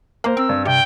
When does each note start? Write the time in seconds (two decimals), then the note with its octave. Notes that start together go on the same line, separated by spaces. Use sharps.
0.24 A#3 A#4 C5
0.37 C4 E6
0.49 G2
0.65 C3 G5